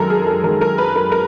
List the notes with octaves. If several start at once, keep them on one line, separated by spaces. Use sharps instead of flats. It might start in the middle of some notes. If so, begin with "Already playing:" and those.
Already playing: F#2 D#3 G#3 A4 A#4
G#4
A4
F#2 D#3 G#3 A#4
A#4
B4
A#4
A#4